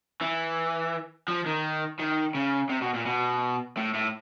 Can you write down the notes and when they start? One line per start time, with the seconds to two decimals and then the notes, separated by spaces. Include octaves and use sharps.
0.21 E3
1.28 F3
1.46 D#3
1.99 D#3
2.35 C#3
2.70 C3
2.82 B2
2.94 A#2
3.06 B2
3.77 A2
3.94 A2